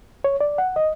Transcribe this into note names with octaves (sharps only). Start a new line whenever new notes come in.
C#5
D5
F#5
D#5